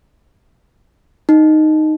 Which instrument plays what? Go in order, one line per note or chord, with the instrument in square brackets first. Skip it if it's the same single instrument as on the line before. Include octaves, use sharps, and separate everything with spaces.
[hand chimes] D#4